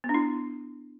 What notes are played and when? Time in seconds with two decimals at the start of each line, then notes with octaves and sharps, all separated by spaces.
0.04 B3
0.09 D4
0.14 E4